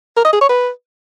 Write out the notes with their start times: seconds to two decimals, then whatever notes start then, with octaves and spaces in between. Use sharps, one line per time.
0.16 A#4
0.25 D#5
0.33 G#4
0.41 C#5
0.49 B4